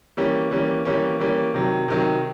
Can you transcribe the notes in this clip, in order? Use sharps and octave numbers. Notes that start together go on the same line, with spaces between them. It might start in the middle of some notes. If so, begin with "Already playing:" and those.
E3 G3 A#3 C#4
E3 G3 A#3 C#4
E3 G3 A#3 C#4
E3 G3 A#3 C#4
C3 D#3 F#3
C3 D#3 F#3